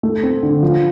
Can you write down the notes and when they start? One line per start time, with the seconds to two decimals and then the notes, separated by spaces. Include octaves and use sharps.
0.03 A3
0.23 C4
0.43 D3
0.63 F3